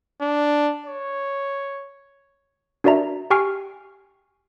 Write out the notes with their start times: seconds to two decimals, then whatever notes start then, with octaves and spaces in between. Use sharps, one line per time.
0.21 D4
0.86 C#5
2.84 D4 F#4 A#4 D5 E5 A#5
3.30 G4 G5 G#5 C#6 F6 C7